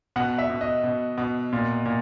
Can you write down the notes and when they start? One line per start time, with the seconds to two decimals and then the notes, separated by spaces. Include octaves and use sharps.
0.16 B2 F#5
0.38 E5
0.50 B2
0.61 D#5
0.84 B2
1.18 B2
1.52 A#2
1.86 A#2